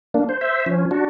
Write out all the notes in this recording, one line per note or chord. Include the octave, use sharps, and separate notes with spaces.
A#3 D4
C5
C5 E5
F3 C#4
D4 F#4